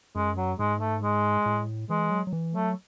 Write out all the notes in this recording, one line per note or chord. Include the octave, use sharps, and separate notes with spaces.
F#2 G#3
F#3
G#2 G#3
A3
G#3
A2
E3 G#3
F#3
F#3
E3
F#3 A3